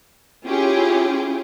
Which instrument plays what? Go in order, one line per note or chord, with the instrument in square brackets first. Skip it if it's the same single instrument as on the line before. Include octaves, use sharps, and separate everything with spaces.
[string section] C#4 E4 F4 G4 G#4